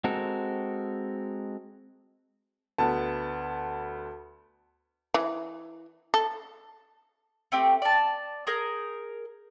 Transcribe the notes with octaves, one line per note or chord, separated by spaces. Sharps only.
G#3 C4 F#4 A4 A#4
D2 B3 A5
E3
A4
A3 C4 G4
D5 A5
G#4 A#4 G6